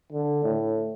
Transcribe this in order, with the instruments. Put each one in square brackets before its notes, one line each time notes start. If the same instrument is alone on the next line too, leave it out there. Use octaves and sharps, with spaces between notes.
[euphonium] D3
A2